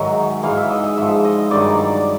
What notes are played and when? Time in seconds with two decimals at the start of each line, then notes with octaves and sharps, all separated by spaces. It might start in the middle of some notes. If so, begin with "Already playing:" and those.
Already playing: G#2 D#3 F#3 E5
0.43 G#2 E3 F5
0.57 E5
0.71 D#5
0.84 E5
0.98 G#2 F3 E5
1.24 D#5
1.50 G2 D#3 F#3 D5
1.78 D5